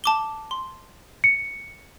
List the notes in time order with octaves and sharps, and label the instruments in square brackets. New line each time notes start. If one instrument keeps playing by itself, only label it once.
[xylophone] A5 D6 G7
C6
[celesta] C#7